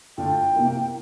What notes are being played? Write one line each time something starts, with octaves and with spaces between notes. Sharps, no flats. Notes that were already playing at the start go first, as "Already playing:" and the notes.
D3 A3 D4 F4 G5
C3 E3 A#3